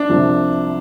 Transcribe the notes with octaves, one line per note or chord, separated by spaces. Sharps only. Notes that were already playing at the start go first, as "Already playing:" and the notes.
Already playing: D4
C2 C3 F3